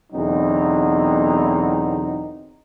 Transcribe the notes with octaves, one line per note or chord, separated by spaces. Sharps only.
E2 B2 D3 F#3 C4 D#4